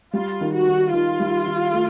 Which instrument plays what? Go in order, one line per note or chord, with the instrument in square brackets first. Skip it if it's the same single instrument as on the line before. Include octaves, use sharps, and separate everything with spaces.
[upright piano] G3 [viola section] F4
[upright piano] D#3
[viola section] F#4
[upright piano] D#3
[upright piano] D#3 [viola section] F4
[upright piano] G3
D#3
A3